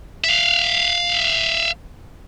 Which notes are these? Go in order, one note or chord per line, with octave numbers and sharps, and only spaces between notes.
E5 F5